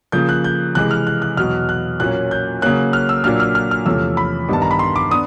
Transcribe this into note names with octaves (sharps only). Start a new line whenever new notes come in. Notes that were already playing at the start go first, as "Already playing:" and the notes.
C#3 F3 A#3 G6
F#6
G6
C3 E3 G#3 F#6
F6
F#6
F#6
E2 B2 F#3 F6
F#6
A#2 F#3 A#3 C#4 F#6
G6
C#3 F#3 A#3 C#4 F#6
F6
E6
A#2 F#3 A#3 D4 F6
F6
F6
F6
E2 C3 F3 A3 C#4 E6
B5
G2 D#3 G3 B3 D4 A5
A#5
B5
C6
D6
B3 D4 D#6